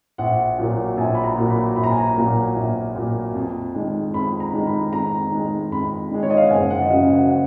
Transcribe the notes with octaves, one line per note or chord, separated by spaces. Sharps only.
A#1 F#5
A#2 F#3 A#3
A#1 G#5
B5
A#5
A#2 F#3 A#3
B5
A#1 B5
A#5
G#5
A#5
A#2 F#3 A#3
A#1
A#2 F#3 A#3
F2
D#3 G#3
F2 B5
A#5
D#3 G#3
B5
F2 A#5
D#3 G#3
F2 B5
D#3 G#3
C#5
D#5
F5
F#5
F#1 G#5
F#5
D#5
F#2 C#3 F#3 F5
F#5
F#5